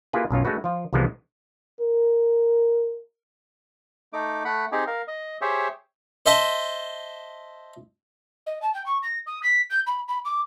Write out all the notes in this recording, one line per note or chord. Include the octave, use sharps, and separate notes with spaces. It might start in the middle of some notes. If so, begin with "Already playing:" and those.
A#3 E4 F4 G4 G#4 B4
B1 F#2 F4 C#5
G#3 A3 D4 F#4 B4
F3 F4
C2 C3 E3 F3 G#3 B3
A#4
A3 D#4 D6
A3 F#5 B5
C4 D#4 G4 G#4
A#4 F5
D#5
G4 G#4 C5 C#5 E5
C5 D#5 E5 A5 C6
D#5
A5
G5
C#6
A#6
D#6
B6
G6
B5
B5
D6